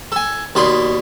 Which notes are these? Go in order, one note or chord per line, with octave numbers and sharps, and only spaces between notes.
A4 G#5
D#2 B2 D5 B5 C6